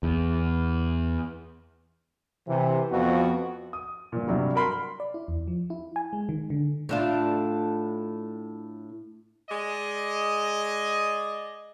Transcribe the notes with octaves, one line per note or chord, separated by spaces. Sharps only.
E2
C3 E3
F2 F3 B3 F#4
D#6
G1 A#2
G2 C3 F#3 G3
F#4 A#4 B5 C6
D5
E4
E2
F3
E4
G#5
G#3
D#3
D3
A2 D4 F4
G#3 D5 D#5